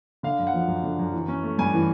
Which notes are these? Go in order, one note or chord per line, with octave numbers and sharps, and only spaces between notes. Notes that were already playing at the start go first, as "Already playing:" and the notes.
D3 F5
F#2
F#5
F3
F#2
D3
F#2
E3
C#4
A3
G2 G#5
E3